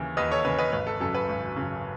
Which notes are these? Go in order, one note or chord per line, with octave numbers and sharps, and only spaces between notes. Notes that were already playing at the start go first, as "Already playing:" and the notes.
Already playing: D#2 C#3 E3
D#2 B4 D#5
A4 C#5
C#3 E3 B4
B4 D#5
G#1 B4
A4
F#2 C#3 A4
B4
G#1
F#2 C#3